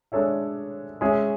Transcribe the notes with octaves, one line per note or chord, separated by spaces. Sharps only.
G#3 D4 A4 C#5 E5
G#3 C#4 G#4 C#5 E5